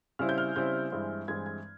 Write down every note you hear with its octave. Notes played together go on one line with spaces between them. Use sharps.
C#3 G3 C4 E4 F6
G6
F6
C#3 G3 C4 E4 G6
G2 E3 G#3 C4 E4
G2 E3 G#3 C4 E4 G#6
G#6